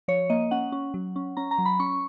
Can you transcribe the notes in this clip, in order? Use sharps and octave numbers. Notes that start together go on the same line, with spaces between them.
F3 C#5
A#3 D#5
C#4 F#5
C#4
F#3
C#4
C#4 A#5
A#5
F#3
B5
C#4 C#6